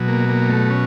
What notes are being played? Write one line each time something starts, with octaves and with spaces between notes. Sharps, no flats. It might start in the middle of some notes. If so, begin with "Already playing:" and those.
Already playing: B2 F#3
A#3
A#3
A3
C#4